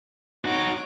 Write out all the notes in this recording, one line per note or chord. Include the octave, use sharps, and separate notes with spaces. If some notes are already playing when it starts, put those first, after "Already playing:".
D#4 F#4 C#5 D6